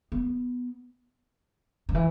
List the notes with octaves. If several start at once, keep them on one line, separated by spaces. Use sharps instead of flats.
B3
D3
E3